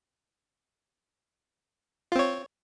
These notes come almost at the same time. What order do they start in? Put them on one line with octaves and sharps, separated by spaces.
F4 C4 C#5